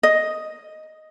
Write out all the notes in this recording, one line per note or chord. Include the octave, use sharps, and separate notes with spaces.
D#5